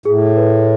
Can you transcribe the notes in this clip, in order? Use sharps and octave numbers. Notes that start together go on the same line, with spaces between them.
A2 G#4
B4